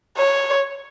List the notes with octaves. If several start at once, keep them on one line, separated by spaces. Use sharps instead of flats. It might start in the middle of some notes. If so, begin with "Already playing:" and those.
C#5